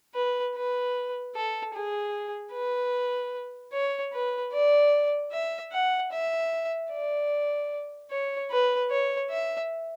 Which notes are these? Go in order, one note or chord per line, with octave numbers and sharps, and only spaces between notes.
B4
B4
A4
G#4
B4
C#5
B4
D5
E5
F#5
E5
D5
C#5
B4
C#5
E5